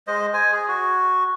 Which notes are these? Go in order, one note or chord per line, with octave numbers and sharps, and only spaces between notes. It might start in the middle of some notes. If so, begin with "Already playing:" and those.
G#3 C5 D#5
C5 G#5
G#4
F#4